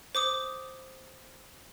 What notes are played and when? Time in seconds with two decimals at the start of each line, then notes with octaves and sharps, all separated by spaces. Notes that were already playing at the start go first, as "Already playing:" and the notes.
0.15 C5 D6 D#6